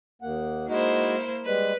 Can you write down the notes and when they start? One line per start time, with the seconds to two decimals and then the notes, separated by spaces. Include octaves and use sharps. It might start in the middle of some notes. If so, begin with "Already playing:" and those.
0.22 D#2 A#3 F#5
0.68 G#3 A#3 D#4 E4 F#4 C5
1.45 G3 G#3 B4